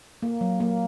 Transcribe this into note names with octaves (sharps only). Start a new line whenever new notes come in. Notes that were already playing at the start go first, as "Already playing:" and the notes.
A#3
F#3
A#3